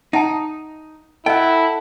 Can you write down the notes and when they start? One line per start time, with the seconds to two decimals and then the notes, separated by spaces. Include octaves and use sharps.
0.13 D#4 E5 F#5 A5
1.26 E4 A4 D#5 F#5 G5